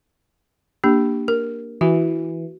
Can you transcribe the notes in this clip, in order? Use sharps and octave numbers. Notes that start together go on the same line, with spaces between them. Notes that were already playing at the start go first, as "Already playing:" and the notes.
A#3 D4 G4
A#4
E3 F#4